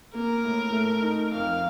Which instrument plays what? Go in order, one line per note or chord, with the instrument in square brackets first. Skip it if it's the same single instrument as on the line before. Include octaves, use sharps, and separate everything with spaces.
[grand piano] A#3 [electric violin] A#4
[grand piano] A2
A3
D#4
[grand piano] F2 [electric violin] F5